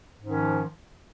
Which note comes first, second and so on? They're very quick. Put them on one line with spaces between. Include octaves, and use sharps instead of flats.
G#2 C#4 D#3 F3